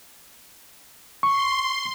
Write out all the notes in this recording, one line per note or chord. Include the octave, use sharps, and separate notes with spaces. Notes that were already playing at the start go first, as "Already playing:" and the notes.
C6 C#6